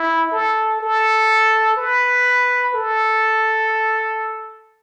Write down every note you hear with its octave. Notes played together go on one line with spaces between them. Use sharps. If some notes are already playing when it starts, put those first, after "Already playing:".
Already playing: E4
A4
A4
B4
A4